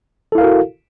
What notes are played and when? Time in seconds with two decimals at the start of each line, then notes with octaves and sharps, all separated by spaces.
0.32 A4
0.35 E4
0.38 F5
0.41 A#4
0.44 F#4